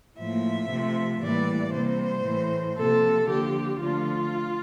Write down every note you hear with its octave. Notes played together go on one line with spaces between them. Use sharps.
A2 F3 A#3 E5
C3 F3 A3
A2 E3 G3 A#3 D5
C3 G3 A#3 C5
A2 E3 A3
C3 F3 A#3 A4
D3 F3 A#3 G4
D3 F3 A3 F4